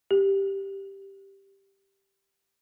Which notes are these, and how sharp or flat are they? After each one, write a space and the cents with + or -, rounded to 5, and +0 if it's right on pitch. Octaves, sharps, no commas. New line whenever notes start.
G4 +0